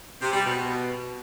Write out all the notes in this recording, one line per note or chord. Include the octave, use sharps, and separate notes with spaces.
C3
G3
B2